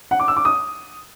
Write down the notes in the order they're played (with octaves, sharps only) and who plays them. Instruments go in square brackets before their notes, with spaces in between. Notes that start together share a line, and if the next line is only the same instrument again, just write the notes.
[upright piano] F#5
D6
E6
D6
D#6